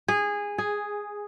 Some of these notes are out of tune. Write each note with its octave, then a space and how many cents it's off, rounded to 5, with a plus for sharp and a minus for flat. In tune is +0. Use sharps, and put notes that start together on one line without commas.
G#4 -15
G#4 +0